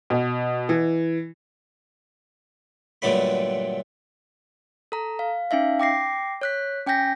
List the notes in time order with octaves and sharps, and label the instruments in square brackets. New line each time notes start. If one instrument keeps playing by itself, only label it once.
[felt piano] B2
E3
[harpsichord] G2 A#2 D3 F#3 A3 B5
[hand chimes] A4 A#5
F5
C#4 D#4 E5 F5
G5 D6 A#6 C7
C#5 F#6 B6
C#4 G5 G#5 G6 A#6 B6